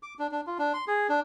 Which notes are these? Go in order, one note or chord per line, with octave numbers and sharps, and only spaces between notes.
D6
D4
D4
F4
D4
C6
G#4
D4